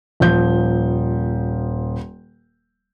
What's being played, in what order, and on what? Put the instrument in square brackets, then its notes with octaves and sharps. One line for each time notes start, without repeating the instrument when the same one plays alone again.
[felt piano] D#1 F3 G6